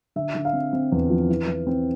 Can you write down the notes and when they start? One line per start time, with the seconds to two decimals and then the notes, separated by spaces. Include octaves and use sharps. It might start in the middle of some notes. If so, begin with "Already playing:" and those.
0.16 D3 E5
0.35 D3
0.45 F5
0.53 C4
0.73 C4
0.92 E2
1.10 F3
1.29 E3
1.47 E3
1.67 C4